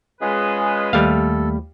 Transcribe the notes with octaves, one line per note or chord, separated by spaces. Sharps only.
G#3 C#4 F4 G#4 B4
D#2 G3 A3 A4 F5 B5